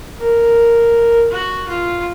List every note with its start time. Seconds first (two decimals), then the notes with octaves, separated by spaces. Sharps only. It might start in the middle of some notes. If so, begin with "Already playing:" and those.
0.19 A#4
1.31 F#4
1.68 F4